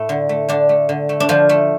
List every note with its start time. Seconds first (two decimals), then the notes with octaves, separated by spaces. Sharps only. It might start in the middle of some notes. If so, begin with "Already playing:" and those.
Already playing: A2 A3
0.09 D3
0.29 A3
0.49 D3 D4
0.69 A3
0.89 D3
1.09 A3
1.20 D4
1.29 D3 F3 F4
1.49 A3